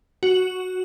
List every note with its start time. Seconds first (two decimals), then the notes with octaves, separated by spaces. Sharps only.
0.23 F#4